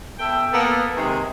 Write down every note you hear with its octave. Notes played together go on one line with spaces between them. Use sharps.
B2 A4 E5 G5
A#3 B3 A4
C3 D#3 G#3